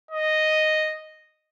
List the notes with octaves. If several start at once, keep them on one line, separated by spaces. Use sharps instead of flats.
D#5